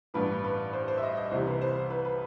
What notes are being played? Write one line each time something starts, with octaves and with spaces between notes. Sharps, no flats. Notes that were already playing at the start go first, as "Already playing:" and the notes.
A1 G2 E3 B4
B4
C5
C5
E5
D#5
D#5
C2 C3 E3 C5
B4
C5
C5
B4
B4